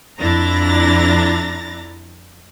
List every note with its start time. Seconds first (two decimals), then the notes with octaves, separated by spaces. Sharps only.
0.19 F2 D4 E4 A#5 A6 A#6